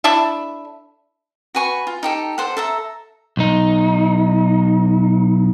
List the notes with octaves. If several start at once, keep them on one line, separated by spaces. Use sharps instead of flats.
D4 E4 A4 E5
F#4 B4 G#5 C#6
F4
D#4 G4 A4
A4 C5 F#5
A4 E5 A#5
B1 D#4